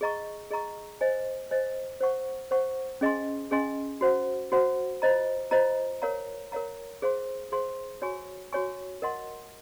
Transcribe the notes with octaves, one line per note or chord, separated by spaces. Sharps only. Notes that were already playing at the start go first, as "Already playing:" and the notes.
G#4 D#5 A#5 C#6
G#4 D#5 A#5 C#6
C5 D#5 G#5
C5 D#5 G#5
C5 F#5 C#6
C5 F#5 C#6
C#4 G#4 D#5 G#5 C6
C#4 G#4 D#5 G#5 C6
F#4 C5 F#5
F#4 C5 F#5
F4 C5 D#5 A#5
F4 C5 D#5 A#5
A#4 C#5 F5 A#5
A#4 C#5 F5 A#5
G#4 C5 F5 C6
G#4 C5 F5 C6
F#4 C#5 G#5 C#6
F#4 C#5 G#5 C#6
A#4 D#5 F#5 C6